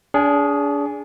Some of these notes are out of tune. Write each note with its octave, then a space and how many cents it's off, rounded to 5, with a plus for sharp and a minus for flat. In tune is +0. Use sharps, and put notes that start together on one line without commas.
D4 -35 G#4 +0